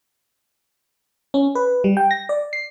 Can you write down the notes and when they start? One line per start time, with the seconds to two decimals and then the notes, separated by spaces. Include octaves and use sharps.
1.34 C#4
1.55 B4
1.84 G3
1.97 G5
2.11 A#6
2.29 D5
2.53 C7